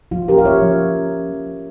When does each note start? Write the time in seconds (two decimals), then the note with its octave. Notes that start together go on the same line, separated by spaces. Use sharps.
0.11 F3 F4
0.28 C#4 G4 A#4
0.38 F5
0.45 C#4 C#5 E5
0.62 F3
0.79 F3
0.96 C#4
1.12 C#4
1.29 F3
1.46 F3